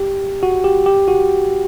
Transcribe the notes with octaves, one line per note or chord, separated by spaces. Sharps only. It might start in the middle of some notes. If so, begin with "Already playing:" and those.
Already playing: G4
F#4
G4
G4
F#4